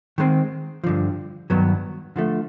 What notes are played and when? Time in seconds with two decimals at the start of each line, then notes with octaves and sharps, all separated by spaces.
0.18 D#3 G#3 C4
0.84 G2 D3 F3
1.50 G2 D#3 F#3 B3
2.16 D3 F3 A3